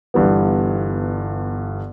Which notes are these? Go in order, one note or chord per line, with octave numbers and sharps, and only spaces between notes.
G1 G2 E3 B3